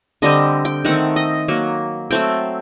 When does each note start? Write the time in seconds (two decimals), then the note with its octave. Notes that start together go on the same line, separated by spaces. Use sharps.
0.22 D3 G3 C4 D#5
0.65 G5
0.85 D#3 A3 C4 F#5
1.16 D#5
1.48 F#3 A#3
2.11 F#3 A3 C4 G5